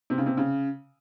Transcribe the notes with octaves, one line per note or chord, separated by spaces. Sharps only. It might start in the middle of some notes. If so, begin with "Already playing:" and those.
C3
C#3
C3
C#3